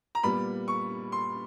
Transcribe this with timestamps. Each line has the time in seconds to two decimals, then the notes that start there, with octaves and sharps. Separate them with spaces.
0.15 A#5
0.23 A#2 G3 B3 B5
0.68 C#6
1.12 C6